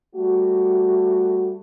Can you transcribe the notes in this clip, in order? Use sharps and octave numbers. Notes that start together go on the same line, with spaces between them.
G3 A3 F#4